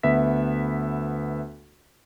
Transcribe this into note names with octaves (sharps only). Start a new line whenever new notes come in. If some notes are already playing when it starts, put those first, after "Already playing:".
D2 B3 E5 B6